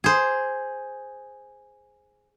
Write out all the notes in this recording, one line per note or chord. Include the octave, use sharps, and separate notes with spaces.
G#4 C5